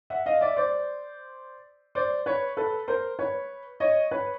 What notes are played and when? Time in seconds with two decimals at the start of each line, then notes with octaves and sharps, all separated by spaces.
0.10 E5 F#5
0.26 D#5 F5
0.41 D5 E5
0.57 C5 D5
1.95 C5 D5
2.26 B4 C#5
2.57 A4 B4
2.88 A#4 C5
3.19 B4 C#5
3.80 C#5 D#5
4.11 B4 C#5